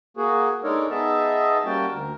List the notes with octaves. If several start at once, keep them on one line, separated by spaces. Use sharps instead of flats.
A#3 F#4 G#4
G#3 D4 D#4 A4 A#4 C#5
B3 D#4 G#4 D#5 E5 A5
G3 A#3 C#4 F#4 G5 A5
D2 A#4